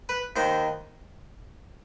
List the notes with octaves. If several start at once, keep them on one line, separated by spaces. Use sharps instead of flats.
B4
D#2 D#3 C5